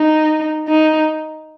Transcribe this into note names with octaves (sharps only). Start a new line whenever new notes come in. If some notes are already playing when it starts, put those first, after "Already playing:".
Already playing: D#4
D#4